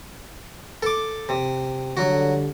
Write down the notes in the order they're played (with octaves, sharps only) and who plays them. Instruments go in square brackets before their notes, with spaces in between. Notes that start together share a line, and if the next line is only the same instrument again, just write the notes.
[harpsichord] A4 D6
C3
[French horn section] D3 G3 [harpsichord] F#3 F#4